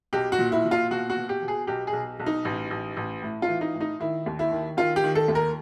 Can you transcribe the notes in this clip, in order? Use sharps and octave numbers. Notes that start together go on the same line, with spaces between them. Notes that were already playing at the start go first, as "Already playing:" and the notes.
B1 G4
F#4
A#2
E4
A#2
F4
B2 F#4
F#4
B2
G4
B2
G#4
B1 G4
G#4
B1
B1
D#4
A1
A1
A1
A2
F4
E3
D#4
A2
D#4
D#3 E4
D#2
E4
D#3
D#3 F4
G4
D#3
A4
D#2
A#4